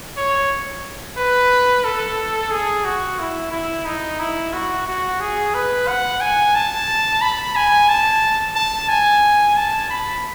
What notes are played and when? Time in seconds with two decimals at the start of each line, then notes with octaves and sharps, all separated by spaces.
0.17 C#5
1.17 B4
1.84 A4
2.51 G#4
2.85 F#4
3.19 E4
3.52 E4
3.86 D#4
4.19 E4
4.53 F#4
4.87 F#4
5.20 G#4
5.54 B4
5.88 F#5
6.21 G#5
6.55 A5
7.22 B5
7.56 G#5
7.89 A5
8.55 A5
8.89 G#5
9.57 A5
9.90 B5